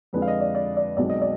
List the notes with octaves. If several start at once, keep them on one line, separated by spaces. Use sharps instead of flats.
F2 D3 G#3 B4
F5
D#5
D5
D5
D5
B1 B2 G#3 C4 D5
D#5
D5